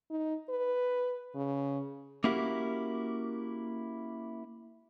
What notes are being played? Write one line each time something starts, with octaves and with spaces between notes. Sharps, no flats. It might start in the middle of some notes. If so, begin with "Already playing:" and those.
D#4
B4
C#3
A#3 C#4 E4 F#4 G4 A#4